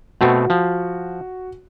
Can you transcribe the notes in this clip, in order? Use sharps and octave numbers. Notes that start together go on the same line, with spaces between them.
B2 A3 C4 F#4
F3